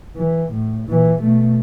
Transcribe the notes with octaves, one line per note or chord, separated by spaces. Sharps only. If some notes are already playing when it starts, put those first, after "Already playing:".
E3
A2
A#2 E3
B2 A3